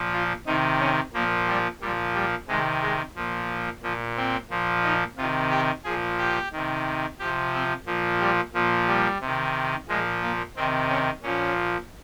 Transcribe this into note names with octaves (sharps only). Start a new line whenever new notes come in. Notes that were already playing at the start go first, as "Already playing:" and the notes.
Already playing: A#2 F3
F4
C3 D#3 D#4
C#4
A#2 F3 A#3
G3
A#2 F3 G3
G3
C3 D#3 G#3
G#3
A#2 F3
A#2 F3
C4
A#2 F3
D#4
C3 D#3 F4
G4
A#2 F3 G#4
G4
C3 D#3
C3 F3 G4
C4
A#2 F3
G3
A#2 F3
G3
C3 D#3
A#2 F3 G#3
A#3
C3 D#3 C4
C#4
A#2 F3 C#4